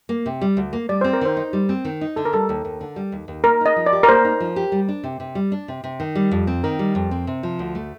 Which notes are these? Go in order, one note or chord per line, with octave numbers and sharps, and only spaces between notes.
A#3
C3
G3
D2
A#3
G3 D5
C4 C5
A#4
D#3 C5
D#4
G3
C4
D#3
D#4
D3 A4
A#4
G3 A4
D#2
D#2
D3
G3
D#2
D#2
A#3 A#4
D#4 D#5
F3
D5
G4
A#4
A#3 C5
D#4
F3
G4
G3
D4
C3
C3
G3
D4
C3
C3
D#3
G3
F2
C4
D#3 A#4
G3
F2
C4
C3
F3
D2
A3